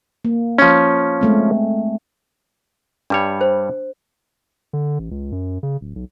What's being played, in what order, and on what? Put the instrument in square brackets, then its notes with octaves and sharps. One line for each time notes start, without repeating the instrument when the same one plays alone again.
[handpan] A#3
[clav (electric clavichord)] F3 C#4
[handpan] G#3 A3 C4
[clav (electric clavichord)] G2 G3 C#5 [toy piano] D4
[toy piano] C5
[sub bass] D3
A1
C#2
F#2
C#3
D1
B1